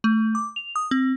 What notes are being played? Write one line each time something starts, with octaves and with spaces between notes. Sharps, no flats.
A3
D6
F7
D#6
C4